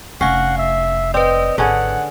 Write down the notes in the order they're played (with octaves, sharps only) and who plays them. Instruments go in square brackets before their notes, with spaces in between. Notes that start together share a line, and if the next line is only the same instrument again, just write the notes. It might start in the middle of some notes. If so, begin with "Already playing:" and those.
[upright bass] F1 [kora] C#4 [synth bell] F5 C7 [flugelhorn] F#5
[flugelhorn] E5
[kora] C4 [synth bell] B4 D5 [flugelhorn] D#5
[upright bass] G#1 [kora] D3 C#4 G#4 [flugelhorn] F#5